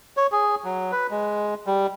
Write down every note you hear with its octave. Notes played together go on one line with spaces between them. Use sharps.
C#5
G#4
F#3
B4
G#3
G3